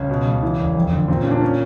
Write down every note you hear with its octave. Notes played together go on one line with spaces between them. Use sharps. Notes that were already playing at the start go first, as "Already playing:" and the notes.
Already playing: C#2 C#4
B2
C#2
E3
E1
F2
D3
A#2 C4
C#4
A#2
D4
C#4